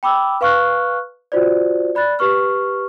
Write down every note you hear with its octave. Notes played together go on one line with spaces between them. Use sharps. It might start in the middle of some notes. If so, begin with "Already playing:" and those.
G5 B5 D6 E6
B4 F5 C#6 F6 F#6
F4 F#4 C5 D5
D5 B5 F#6 A6
G4 B4 C#6 F6